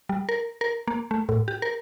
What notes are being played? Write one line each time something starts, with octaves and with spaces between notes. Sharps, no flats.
G3
A#4
A#4
A#3
A3
A2
G4
A#4